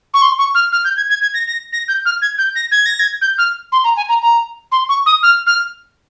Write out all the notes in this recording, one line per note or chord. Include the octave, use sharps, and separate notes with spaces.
C#6
C6
C#6
F6
F6
G6
G#6
G#6
G#6
A#6
A#6
A#6
G6
F6
G#6
G6
A#6
G#6
A#6
G#6
G6
F6
C6
A#5
G#5
A#5
A#5
C6
C#6
D#6
F6
F6